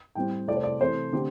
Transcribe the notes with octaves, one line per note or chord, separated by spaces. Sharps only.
A2 G3 C4 G5
C3 A3 C4 D5
C5
D5
C3 E3 A3 C5
D3 A3 C4 G4